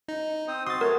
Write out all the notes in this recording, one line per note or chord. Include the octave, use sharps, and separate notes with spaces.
D#4
C4 C5 D#6
F#4 C6 D#6 A6
A3 F#4 A#4 C#5